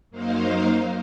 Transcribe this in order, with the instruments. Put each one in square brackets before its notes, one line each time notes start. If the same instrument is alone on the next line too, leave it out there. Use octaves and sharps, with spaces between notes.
[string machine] F#2 F#3 A#3 D#4 C5 F5